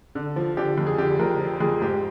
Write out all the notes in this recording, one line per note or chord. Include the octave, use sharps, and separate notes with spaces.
D3
F3
D3 G4
F2
G#4
D3 G4
F2 A#4
F3
F2 G#4
G#2 G4